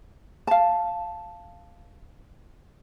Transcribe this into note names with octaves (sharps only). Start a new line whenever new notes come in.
F5 A5